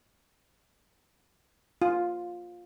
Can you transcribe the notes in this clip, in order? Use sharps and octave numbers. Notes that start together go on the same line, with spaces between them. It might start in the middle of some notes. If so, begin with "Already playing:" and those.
F4